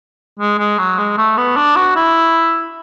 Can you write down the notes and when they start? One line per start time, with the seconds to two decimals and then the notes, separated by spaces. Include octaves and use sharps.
0.39 G#3
0.59 G#3
0.78 F#3
0.98 G#3
1.18 A3
1.38 B3
1.56 D4
1.76 F#4
1.96 E4